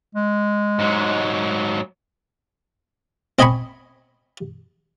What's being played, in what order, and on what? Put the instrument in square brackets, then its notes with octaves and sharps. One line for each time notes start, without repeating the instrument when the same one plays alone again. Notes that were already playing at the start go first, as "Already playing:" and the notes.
[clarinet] G#3
[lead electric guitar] G#2 F#3
[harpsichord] C4 D#5 G#5 B5 C#6